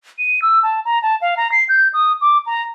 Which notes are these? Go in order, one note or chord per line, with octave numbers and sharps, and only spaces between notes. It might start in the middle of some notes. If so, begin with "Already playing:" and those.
D#7
E6
A5
A#5
A5
F5
A#5
C7
G6
D#6
D6
A#5